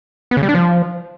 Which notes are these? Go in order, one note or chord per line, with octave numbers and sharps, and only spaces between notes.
B3
C#3
G3
D4
F3